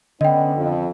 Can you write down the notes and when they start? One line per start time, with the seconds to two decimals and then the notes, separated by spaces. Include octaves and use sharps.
0.21 D3 B3 C#4 D4 D#5 G5
0.56 F2